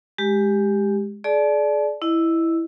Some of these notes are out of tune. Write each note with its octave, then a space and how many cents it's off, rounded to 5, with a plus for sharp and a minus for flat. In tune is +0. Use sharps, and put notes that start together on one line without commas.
G#3 +0 G4 +5
G#4 +35 D5 +0 A5 -35
E4 +0 D#5 -10